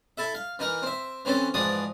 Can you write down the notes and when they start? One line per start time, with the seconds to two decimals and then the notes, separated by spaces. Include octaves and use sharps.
0.17 E4 A4 E5
0.34 F5
0.59 E3 D#4 A#4
0.82 C4 E5
1.25 E3 C4 C#4 A4
1.54 G#2 E3 F3 D5 D#6